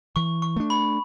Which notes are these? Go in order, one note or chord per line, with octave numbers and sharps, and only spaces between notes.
E3 C#6
C#6
A3 D4
B5